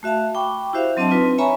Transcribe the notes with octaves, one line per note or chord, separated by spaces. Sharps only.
A3 F#4 E5 F5 A5
G5 B5 C#6 D6
E4 F#4 G4 C5 E5 F5
F#3 C4 D4 D#5 A5
C4 D#4 F4 B4
C#5 E5 G#5 A#5 B5 C#6